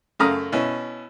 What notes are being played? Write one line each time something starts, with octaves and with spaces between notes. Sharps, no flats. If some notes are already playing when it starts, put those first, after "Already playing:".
F#2 C#3 A3 F5 A#5 D#6
B2 C#4 E4